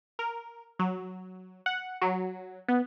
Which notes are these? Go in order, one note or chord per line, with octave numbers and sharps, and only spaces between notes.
A#4
F#3
F#5
F#3
B3